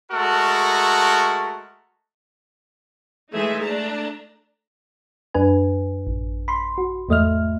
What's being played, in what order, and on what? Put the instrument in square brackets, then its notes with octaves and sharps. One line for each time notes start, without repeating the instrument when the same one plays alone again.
[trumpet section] G#3 A3 F#4 A4 A#4
[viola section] E3 G#3 A3 D#4 G#4 E5
A3 D4 A5 A#5
[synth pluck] F#2 D4 B4 G#5
A1
B5 C6
F#4
E2 G#2 A3 D#5 E5 F6